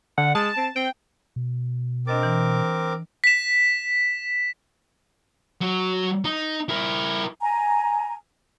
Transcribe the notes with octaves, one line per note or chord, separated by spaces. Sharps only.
D3 F#5
G#3 A5
C4
C4 G5
B2
C4 D4 A#4 D#5 D6 A6
E3
B6 E7
F#3
D#4
E4 A#4
G#5 A#5